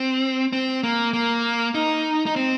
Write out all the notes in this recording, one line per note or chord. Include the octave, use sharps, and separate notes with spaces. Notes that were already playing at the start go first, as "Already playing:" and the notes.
Already playing: C4
C4
A#3
A#3
D#4
D#4
C4